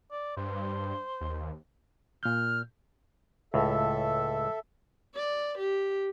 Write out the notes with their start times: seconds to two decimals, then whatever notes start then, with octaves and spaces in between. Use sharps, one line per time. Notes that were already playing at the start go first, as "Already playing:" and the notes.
0.11 D5
0.37 G2 C5
1.21 D#2
2.23 A#2 F6 G6
3.54 C#2 A2 A4 E5
5.15 D5
5.58 G4